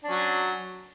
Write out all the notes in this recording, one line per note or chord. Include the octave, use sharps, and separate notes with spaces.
F#3 C#4 D4